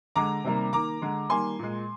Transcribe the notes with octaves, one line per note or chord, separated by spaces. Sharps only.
D3 G#3 A#5 D6
C3 D#3 G3 A#3
D#3 A#3 A#5 D6
D3 G#3
D#3 G3 A#3 G#5 C6
A#2 G#3